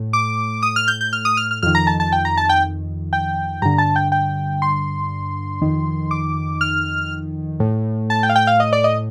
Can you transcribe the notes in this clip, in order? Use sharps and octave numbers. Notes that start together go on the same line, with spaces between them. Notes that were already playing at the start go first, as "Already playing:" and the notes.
Already playing: A2
D6
D#6
F6
G6
G6
F6
D#6
F6
F6
F2 D#3 F6
A#5
A5
A5
G5
A#5
A5
G5
G5
G2 D3 A#5
A5
G5
G5
C6
F2 D#3
D6
F6
A2
A5
G5
F5
G5
F5
D#5
D5
D#5